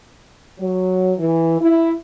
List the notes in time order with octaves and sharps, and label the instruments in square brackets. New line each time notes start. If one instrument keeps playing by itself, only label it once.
[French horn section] F#3
E3
E4